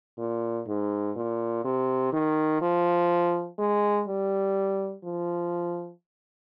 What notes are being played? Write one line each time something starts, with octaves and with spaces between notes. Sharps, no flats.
A#2
G#2
A#2
C3
D#3
F3
G#3
G3
F3